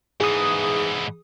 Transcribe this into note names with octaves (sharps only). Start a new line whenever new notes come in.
G#2 E3 G#4 D#6